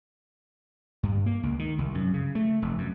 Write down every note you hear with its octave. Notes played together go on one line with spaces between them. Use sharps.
G2
A#3
C#2
D#3
C2
F#2
C#3
A3
F1
F#2